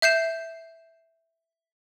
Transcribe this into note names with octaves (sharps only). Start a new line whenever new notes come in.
E5 G6 C7 E7